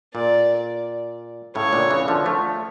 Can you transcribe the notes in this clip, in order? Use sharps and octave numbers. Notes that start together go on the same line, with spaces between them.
A#2 D5
A2 C#3 C#5
A#2 D3
C#3 E3
D3 F3
F3 A3